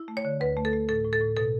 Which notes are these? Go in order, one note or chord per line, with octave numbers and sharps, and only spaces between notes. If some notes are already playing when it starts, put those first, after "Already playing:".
Already playing: E4
A3
C#5
D3
D2 B4
A3
A4
A3
A2 A4
A2
A4
A2
B2 A4